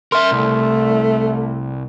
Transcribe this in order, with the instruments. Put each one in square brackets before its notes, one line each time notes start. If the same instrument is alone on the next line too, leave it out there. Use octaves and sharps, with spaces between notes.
[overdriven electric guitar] A#4 E5 [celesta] C6 F6
[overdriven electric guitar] C2 [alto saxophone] A3